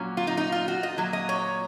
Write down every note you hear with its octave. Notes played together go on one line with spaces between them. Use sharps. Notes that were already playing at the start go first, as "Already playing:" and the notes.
Already playing: A#2 F#3 C#4
F4
D#4
D#4
F4
F#4
D#5
A#2 F#3
D#5
C#5